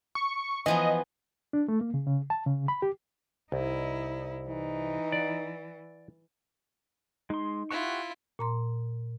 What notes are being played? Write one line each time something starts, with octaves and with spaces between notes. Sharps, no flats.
C#6
E3 F3 B3 D#5
D4
A3
A#3
C#3
C#3
A5
C#3
B5
G4
C2 D#4 E4
E3 D#4
D5 F#5
G#3 D#4 C6
E4 F4 G4 F#5 C#6
A#2 A#5 C6